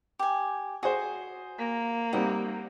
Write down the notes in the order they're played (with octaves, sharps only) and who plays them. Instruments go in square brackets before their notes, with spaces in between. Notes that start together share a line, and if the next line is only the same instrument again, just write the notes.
[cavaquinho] G4 G#5
[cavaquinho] F#4 [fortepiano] G#4 C5
[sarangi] A#3
[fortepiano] G3 C4 D#4 [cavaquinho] F#5